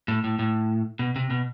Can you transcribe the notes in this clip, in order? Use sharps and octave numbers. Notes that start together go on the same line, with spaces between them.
A2
A2
A2
B2
C3
B2